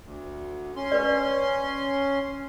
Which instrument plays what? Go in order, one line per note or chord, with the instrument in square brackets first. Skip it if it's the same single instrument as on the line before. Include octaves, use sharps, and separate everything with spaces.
[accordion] D2
C#4 C6
[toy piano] B4 D5